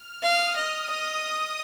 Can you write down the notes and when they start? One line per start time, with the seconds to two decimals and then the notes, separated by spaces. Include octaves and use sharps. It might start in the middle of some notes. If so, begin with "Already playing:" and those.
Already playing: F6
0.23 F5 D#6
0.56 D#5
0.90 D#5
1.24 D#6